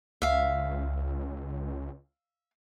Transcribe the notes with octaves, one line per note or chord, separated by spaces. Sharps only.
C#2 E5 F5